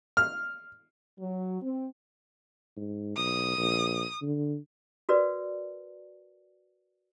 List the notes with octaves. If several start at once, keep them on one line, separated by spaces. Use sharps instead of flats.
F6
F#3
C4
G#2
B1 D#6
A#1
D3
F#4 A#4 B4 D5